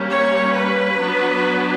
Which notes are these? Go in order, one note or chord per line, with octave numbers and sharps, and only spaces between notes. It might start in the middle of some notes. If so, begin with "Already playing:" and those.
Already playing: G3 A#3 C#4
C#5
B4
F#3 B3 D4